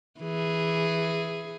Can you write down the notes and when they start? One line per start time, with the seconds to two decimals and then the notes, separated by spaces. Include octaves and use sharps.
0.20 E3 G#4